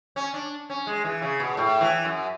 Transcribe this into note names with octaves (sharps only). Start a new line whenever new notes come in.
C#4
D4
C#4
G#3
E3
C#3
B2
A2
E3
F#2